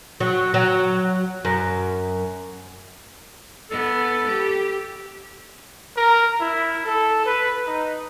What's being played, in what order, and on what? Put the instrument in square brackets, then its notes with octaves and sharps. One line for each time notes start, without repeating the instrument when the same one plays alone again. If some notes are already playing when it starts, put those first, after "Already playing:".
[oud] F#3
F#3
F#2
[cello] B3 [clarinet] A4
[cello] G4
[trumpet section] A#4
E4
A4
B4
D#4